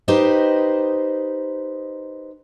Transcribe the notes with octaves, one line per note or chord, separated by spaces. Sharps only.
D#4 G4 B4 C5 D#5